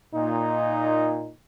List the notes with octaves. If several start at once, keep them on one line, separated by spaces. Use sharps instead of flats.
A#2 D#4